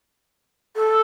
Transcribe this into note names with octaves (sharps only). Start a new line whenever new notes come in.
A4